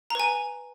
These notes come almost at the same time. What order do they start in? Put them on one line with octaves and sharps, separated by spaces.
A#5 B4 G#5